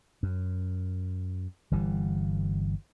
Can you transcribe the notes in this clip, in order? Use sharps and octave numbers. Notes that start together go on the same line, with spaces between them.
F#2
G1 E3 G3